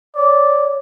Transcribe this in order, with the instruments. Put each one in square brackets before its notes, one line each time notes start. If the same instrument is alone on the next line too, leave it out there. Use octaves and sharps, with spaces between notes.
[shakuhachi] C#5 [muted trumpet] D5